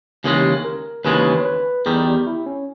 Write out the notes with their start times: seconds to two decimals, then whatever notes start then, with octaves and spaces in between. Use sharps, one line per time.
0.24 D#2 C#3 E3 G#3 G4
0.65 A#4
1.05 D#2 C#3 E3 G#3 B4
1.40 C#5
1.45 B4
1.86 E2 D#3 G3 G#4
2.05 G4
2.27 E4
2.46 C#4